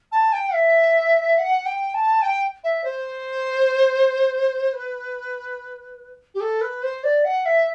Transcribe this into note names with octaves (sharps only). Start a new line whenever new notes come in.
A5
G5
E5
F#5
G5
A5
G5
E5
C5
B4
G4
A4
B4
C5
D5
F#5
E5